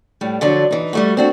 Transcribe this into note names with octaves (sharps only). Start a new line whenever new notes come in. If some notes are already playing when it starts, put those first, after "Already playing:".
A2 G3
D3 F3 F#3 D4
E3 D#4
G3 A3 F#4
C4 D4 F#4